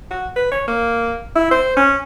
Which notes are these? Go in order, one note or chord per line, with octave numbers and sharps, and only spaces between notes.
F#4
B4
C#5
A#3
E4
C5
C#4